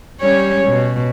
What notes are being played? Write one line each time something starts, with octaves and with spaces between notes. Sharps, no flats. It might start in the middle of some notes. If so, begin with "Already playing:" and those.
G3 C#4 C#5
B2